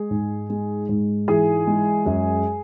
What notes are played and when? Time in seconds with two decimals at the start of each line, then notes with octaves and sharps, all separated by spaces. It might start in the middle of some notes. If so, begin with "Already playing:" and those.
Already playing: G#3 G#4
0.11 G#2
0.50 G#3
0.89 G#2
1.28 E3 G#4 G#5
1.67 G#3
2.06 F#2